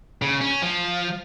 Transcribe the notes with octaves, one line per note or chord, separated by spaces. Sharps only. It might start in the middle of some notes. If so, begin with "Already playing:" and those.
C#3
C#4
F3